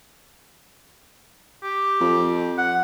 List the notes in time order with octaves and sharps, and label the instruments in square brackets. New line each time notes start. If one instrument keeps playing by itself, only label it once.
[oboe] G4
[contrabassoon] F2
[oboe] F#5